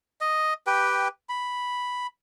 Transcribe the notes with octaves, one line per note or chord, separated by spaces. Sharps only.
D#5
G4 B4 G5
B5